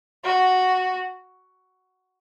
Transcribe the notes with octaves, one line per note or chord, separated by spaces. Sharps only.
F#4